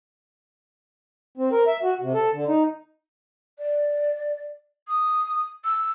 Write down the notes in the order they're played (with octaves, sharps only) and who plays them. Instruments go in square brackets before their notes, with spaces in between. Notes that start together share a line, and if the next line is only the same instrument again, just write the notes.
[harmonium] C4
A#4
E5
F#4
C3
A4
D3
D#4
[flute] D5
D#6
E6